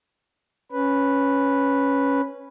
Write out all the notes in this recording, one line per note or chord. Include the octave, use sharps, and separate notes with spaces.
C#4 B4